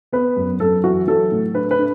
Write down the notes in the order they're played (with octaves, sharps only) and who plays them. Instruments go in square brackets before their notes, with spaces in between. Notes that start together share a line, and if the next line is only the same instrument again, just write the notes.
[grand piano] B3 B4
F#2
F#2 A4
E3 F#4
F#3 A4
A2
D4 B4
B4
D4